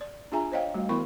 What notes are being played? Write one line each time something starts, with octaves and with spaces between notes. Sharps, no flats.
D5
D4 F4 G#4 E5 G#5 A#5
C5 C#5 D#5 F5 G5
G3 A3 F#4
E3 B3 E4 A#4 B5 C#6